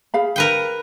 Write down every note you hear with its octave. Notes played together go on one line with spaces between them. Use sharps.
G#4 F5 B5
A#4 B4 G5